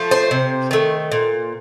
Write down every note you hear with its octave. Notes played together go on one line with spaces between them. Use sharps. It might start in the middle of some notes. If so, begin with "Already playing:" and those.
Already playing: F3 A3
C5
C3
D#3 A3
A#2